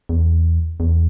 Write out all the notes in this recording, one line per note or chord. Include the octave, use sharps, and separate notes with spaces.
E2
E2